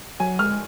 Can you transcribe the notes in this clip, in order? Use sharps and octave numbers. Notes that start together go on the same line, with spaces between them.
F#3 G#5
G#3 F6